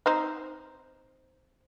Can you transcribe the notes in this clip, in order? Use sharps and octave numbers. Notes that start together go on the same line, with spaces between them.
C4 D#4 C5